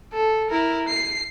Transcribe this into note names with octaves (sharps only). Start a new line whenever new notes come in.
A4
E4 A#4
C7